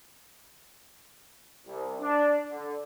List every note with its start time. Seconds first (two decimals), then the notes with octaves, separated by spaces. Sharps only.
1.67 C2
2.00 D4
2.51 D3